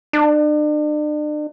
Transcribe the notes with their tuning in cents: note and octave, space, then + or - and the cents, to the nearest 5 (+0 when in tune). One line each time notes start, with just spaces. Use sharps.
D4 +40